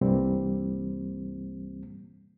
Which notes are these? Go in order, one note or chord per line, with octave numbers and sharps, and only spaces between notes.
C2 G2 E3 G3 A#3 C4